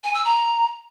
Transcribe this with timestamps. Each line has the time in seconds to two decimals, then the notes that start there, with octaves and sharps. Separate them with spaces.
0.04 G#5
0.14 E6
0.25 A#5